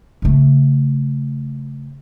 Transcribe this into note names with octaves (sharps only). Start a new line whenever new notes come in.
C#3 A3